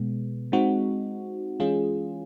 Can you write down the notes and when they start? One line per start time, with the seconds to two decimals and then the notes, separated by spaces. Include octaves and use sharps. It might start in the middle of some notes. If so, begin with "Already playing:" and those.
Already playing: B2 G#3 B3
0.52 G#3 C4 D#4 F#4
1.60 E3 G#3 C#4 F4 G#4